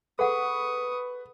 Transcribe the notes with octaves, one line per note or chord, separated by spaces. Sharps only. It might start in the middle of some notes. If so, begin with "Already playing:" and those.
G#4 A4 B4 F#5 C#6 D#6